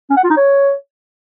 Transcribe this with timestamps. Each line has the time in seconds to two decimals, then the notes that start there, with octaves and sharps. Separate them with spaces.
0.10 C#4
0.17 F#5
0.24 F4
0.30 D#4
0.37 C#5